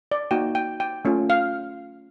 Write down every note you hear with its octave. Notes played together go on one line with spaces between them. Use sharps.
D5
A#3 D#4 F#4 G5
G5
G5
A3 C#4 F4
F5